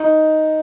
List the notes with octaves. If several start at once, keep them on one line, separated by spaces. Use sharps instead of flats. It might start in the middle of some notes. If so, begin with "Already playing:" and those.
Already playing: D#4